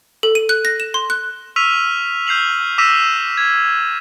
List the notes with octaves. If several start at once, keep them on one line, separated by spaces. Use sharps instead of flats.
A4
D#7
F#6
A#6
E7
C6
F#6
C#6 E6 F6 B6 D#7 F7
F6 G6 C7 F7 F#7
D6 E6 A#6 B6 D#7 E7
G#6